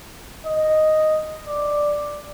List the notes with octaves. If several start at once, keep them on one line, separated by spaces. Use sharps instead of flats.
D#5
D5